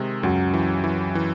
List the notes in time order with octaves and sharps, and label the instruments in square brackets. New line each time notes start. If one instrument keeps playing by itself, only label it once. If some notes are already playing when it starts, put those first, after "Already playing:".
Already playing: [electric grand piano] C3 D#3 G#3
[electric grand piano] C#2 [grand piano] F#2 F#3
[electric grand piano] E3
E3
E3